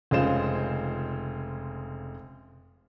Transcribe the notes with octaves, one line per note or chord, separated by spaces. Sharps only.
F1 C#3 G#3 F4 C5 E7